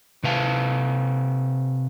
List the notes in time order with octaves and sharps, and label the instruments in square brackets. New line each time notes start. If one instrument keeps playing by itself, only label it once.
[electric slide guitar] C3 B4 F5 A5